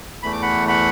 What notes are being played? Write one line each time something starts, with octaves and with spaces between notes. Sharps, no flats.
E2 E3 A3 B5
D6
F#5 B5
F#5 B5